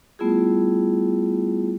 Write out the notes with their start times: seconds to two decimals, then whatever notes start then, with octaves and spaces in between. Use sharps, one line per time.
0.19 G3 A3 B3 E4 F4 G#4